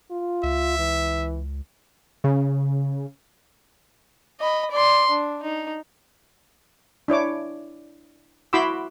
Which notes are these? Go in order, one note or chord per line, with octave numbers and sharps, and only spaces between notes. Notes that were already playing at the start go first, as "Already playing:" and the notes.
F4
C#2 E5
E3
C#3
D#5 B5
D5 C6
D4
D#4
D4 E4 C#5 D6
E4 F#4 B5 C6 D6 E6